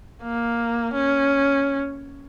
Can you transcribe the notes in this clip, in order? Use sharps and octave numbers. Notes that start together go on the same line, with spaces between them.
A#3
C#4